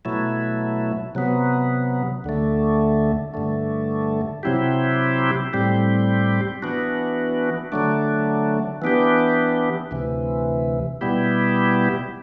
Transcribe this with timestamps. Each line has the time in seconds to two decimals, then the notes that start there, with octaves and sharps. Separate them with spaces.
0.05 B2 F#3 A3 E4
1.15 C3 F#3 B3
2.24 D2 D3 A3
3.34 G2 D3 A3
4.43 C3 F#3 C4 E4 G4
5.53 A2 G3 C4 G4
6.62 E3 B3 D4 F#4
7.72 D3 F#3 A3 D4
8.82 E3 B3 D4 G4
9.91 D2 C3 E3
11.01 B2 G3 B3 E4 G4